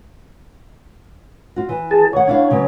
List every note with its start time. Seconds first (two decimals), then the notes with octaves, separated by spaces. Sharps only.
1.56 F4 F#4
1.69 E3
1.91 G#4 A5
2.13 D#3 C#5 F#5
2.27 D4 E4 F5
2.50 C#3 F#3 B3